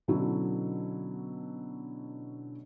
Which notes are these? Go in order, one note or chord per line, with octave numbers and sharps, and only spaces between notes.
B2 D3 F#3 C#4 D4 E4